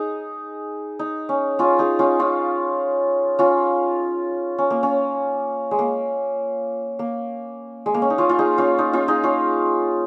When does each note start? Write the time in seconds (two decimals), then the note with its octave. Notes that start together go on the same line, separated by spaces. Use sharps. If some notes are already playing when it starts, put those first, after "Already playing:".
Already playing: D#4 G#4
0.99 D#4
1.29 C#4
1.59 C#4 F4
1.79 D#4 G#4
1.99 C#4 F4
2.19 C#4 F4
3.39 C#4 F4
4.58 C#4
4.70 A#3
4.83 C#4
5.71 G#3
5.79 A#3
6.99 A#3
7.86 G#3
7.94 A#3
8.02 C#4
8.10 D#4
8.18 C#4 F4
8.29 F4
8.39 D#4 G#4
8.58 C#4 F4
8.78 D#4
8.93 C#4 F4
9.08 D#4 G#4
9.23 C#4 F4